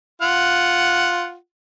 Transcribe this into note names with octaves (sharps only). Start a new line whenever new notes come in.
F4 F#5